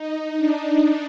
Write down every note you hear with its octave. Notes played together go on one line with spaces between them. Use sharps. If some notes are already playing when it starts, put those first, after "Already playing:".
Already playing: D#4
D4